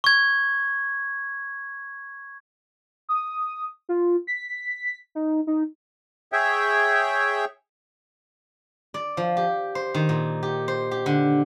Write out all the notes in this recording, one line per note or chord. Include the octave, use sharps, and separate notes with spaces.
C#6 G#6
D#6
F4
B6
D#4
D#4
G#4 C#5 E5 G5
D5
F3
G4
C5
D#3
A#2
G4
C5
G4
D3